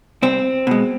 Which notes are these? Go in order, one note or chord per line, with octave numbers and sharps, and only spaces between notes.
C2 C4
B2 G#3